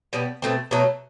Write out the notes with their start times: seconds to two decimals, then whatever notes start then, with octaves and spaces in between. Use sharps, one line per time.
0.13 B2 G3 B3
0.42 B2 A3 C4
0.71 B2 F#3 A3